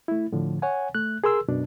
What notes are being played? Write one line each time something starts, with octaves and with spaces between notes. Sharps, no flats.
A3 E4
A2 D3 F3
C#5 F#5 G#5
A3 F#6
G#4 A#4 C6 E6
F#2 B2 D4